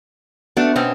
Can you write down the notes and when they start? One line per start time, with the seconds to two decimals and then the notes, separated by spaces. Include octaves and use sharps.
0.57 A3 B3 D4 F#4
0.76 B2 C4 C#4